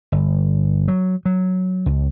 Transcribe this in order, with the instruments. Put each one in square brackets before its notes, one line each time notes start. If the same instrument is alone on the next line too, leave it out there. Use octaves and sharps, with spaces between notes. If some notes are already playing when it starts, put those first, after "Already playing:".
[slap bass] G1
F#3
F#3
C#2